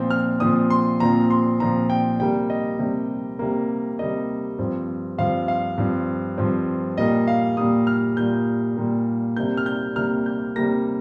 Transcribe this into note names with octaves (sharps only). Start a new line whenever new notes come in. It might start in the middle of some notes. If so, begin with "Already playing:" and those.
Already playing: A#2 F3 C4
F6
A#2 F3 C4 D#6
C6
A#2 F3 C4 A#5
C6
A#2 F3 C4 A#5
G5
C3 G3 A#3 G5
D#5
C3 G3 A#3
C3 G3 A#3
C3 G3 A#3 D#5
G2 F3 C4
G2 F3 C4 F5
F5
G2 F3 C4
G2 F3 C4
A#2 G3 A#3 D#5
F5
A#2 G3 A#3 D#6
F6
A#2 G3 A#3 G6
A#2 G3 A#3
C3 G3 A#3 G6
F6
G6
C3 G3 A#3 F6
G6
C3 G3 A#3 A#6